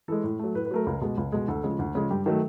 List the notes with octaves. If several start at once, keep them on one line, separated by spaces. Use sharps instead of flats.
E3 G#3 A4
A2
F#3 A3
A2 B4
B4
F#3 A3 A#4
C#2
B2 G#3
C#2
B2 G#3
D2 A4
C#3 F3 G#3
D2
C#3 F3 G#3
G2 G4
D#3 F#3 A3